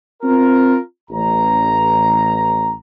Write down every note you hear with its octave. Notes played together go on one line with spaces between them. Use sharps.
C4 F4 A#4
A1 A#5